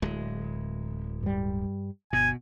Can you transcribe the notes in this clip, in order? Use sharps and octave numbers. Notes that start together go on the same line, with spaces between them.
D1 G#3
G2 G3
G1 B2 G#5